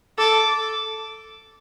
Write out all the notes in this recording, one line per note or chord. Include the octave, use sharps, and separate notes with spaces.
A4 D6